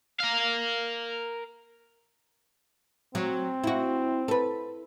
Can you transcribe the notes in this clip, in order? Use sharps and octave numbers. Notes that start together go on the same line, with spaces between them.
A#4 F5
F#3 C4
E4 F#4
A4 B4